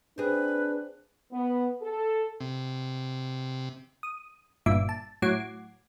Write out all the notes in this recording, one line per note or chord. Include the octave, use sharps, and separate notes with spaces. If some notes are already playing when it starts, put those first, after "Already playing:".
C4 D4 G#4 B4
B3
A4
C3
D#6
G1 G2 A#2 E5 D6
A5
A2 F#3 F#5 D6 G#6 C7